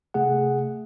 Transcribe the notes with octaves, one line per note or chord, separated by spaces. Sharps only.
C3 A3 G#4 F#5